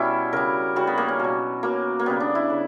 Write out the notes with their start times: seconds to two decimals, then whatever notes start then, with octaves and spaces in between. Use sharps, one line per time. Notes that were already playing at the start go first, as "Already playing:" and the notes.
Already playing: B2 G3 C#4 E4
0.33 C#3 G3 A#4
0.76 C#3 G3 F#4
0.87 B3
0.98 A#3
1.08 C#4
1.19 B2 F#3
1.63 B2 F#3 A#3
1.99 A#3
2.06 C#3 G3 B3
2.20 D4
2.35 E4
2.50 C#3